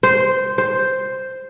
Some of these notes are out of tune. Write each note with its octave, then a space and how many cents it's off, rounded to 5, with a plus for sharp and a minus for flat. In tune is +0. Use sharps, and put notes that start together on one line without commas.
C5 -10
C5 +0